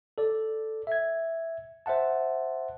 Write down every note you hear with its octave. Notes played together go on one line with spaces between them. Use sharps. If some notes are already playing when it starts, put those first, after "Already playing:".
A4 D5
E5 G#6
C5 E5 F#5 A5